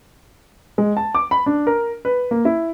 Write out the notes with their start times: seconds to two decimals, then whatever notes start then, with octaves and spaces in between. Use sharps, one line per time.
0.78 G#3
0.97 A5
1.15 D6
1.31 B5
1.46 D4
1.67 A#4
2.05 B4
2.31 A#3
2.45 E4